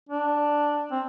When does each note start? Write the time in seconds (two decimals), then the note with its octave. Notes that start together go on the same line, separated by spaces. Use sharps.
0.09 D4
0.92 C4